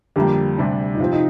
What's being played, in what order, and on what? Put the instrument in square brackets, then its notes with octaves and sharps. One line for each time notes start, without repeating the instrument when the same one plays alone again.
[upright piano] F2 D3 G3 A#3 [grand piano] G4
[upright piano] D2 C3 G3 D4
[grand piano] D#4
[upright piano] C3 F3 C4 [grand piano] F4
[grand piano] D#4